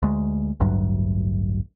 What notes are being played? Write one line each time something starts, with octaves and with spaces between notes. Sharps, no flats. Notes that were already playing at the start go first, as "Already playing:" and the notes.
D2 G#3
A1 D2 G2 F#3